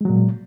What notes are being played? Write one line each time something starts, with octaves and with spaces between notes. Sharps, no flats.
A#2 F#3 G#3